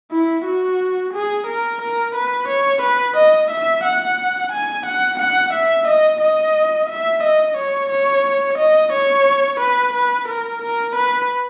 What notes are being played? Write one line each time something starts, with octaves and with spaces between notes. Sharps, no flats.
E4
F#4
G#4
A#4
A#4
B4
C#5
B4
D#5
E5
F#5
G#5
F#5
F#5
E5
D#5
D#5
E5
D#5
C#5
C#5
D#5
C#5
B4
B4
A#4
A#4
B4